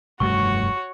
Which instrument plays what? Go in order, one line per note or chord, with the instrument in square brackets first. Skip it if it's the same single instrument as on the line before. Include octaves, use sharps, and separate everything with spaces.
[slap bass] F1 G2 A3 [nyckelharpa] F#4 C#5 [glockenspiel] C#6